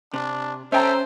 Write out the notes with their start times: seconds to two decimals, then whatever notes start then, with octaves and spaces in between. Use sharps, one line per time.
0.14 C3 D4
0.72 C#4 A4 C5 E5 G5 A#5